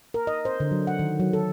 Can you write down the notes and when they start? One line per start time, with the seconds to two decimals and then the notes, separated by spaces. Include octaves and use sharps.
0.14 A#4
0.27 D#5
0.45 C5
0.60 D3
0.71 F#3
0.87 F#5
0.99 D#3
1.20 F#3
1.33 A4